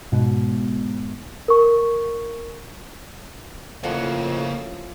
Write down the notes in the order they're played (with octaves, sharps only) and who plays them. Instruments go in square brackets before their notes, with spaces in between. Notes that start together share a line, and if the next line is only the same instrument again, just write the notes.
[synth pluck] G#2 B2
[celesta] A#4 C#6
[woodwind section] F2 [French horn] A2 [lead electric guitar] C#3 A#3 [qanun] F3 F5 F#5